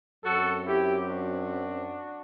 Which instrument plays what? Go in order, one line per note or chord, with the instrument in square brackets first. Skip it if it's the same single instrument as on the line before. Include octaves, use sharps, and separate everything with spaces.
[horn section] F#2 F#3 C4 F#4 A4
E4 G4
D4 F#4